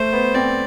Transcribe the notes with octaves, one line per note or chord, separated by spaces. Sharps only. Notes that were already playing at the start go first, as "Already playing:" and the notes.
Already playing: A3 C5
B3
C4 D5